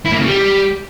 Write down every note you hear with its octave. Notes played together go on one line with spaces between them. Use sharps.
E4
A#3
C#3
G3